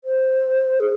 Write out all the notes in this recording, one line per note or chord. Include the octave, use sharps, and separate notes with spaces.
C5
G#4